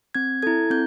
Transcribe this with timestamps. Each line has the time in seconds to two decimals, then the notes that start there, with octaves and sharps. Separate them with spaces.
0.15 C4 G#6
0.42 E4 A4 G#6
0.70 C4 G6